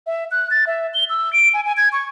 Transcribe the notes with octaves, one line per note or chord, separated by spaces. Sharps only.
E5
F#6
A6
E5
G7
E6
D7
G#5
G#5
G#6
C#6